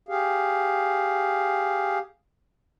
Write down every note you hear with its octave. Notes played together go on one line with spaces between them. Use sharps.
G4 G#4 F5